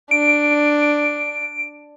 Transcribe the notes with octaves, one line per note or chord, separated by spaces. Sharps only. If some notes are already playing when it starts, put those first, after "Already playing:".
D4 D7